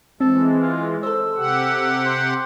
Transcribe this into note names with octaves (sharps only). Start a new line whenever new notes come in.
E3 G#3 C4 A4
F4
A4 C5 E6
C3 G4 F#5
C5